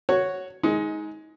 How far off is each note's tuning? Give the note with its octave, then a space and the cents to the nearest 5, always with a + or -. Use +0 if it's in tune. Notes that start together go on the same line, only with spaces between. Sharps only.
F#4 +0 C#5 +0
G#3 +10 D#4 +25